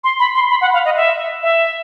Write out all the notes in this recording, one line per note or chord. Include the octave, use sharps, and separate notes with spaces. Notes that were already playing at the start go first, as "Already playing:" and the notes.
C6
B5
C6
B5
F#5
F5
D#5
E5
E5